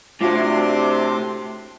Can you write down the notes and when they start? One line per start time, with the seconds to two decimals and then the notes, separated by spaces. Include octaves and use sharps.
0.21 A2 C3 D4 F4 F#4 C6 D6